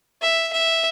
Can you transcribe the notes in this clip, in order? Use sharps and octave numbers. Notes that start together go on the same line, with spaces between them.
E5
E5